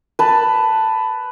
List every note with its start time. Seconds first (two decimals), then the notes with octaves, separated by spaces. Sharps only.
0.19 B4 A5